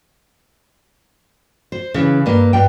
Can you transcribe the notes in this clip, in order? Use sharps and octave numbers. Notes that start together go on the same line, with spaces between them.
C5
C#3 E3
G2 A#3
G2 G5